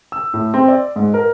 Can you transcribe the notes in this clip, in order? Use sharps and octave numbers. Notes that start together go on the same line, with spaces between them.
E6
A2
C4
D5
G#2
A#4